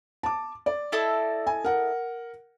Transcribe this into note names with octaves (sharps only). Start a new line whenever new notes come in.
A5 D6
D5
E4 A4 D#5
G#5
A#4 F#5